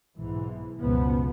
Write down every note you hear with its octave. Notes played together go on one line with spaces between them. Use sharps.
B1 G#2 E3
C#2 F#2 B2 F3 B3